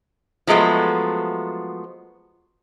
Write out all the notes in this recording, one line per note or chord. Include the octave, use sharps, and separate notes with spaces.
F3 F#3 G#3 A3 B3